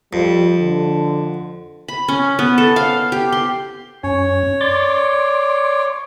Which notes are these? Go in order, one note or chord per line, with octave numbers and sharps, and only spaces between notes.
F2 G3
D3
B5
C#4
B3
A4
F5
G4
C6
F#2 C#4 C#5
D5 C6 D6